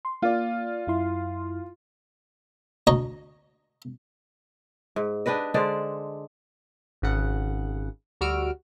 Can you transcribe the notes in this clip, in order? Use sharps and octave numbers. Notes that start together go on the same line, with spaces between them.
C6
A#3 F4 D5
F#2 E4 C6
D2 C#5 D#5 A#5
G#2
D4 G4 B4 D#5
D3 G#3 C5 D5
G#1 C#3 F#5
D2 G3 F#4 E6 F6 D7